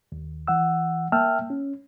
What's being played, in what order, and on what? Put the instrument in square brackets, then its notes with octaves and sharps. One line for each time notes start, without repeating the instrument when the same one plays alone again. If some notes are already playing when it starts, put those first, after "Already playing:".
[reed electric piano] D#2
E3 F#5 E6
A#3 E5 G5 A5 E6 F6
C#4